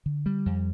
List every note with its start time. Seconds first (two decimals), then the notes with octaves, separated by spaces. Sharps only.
0.06 D3
0.26 G3
0.46 F2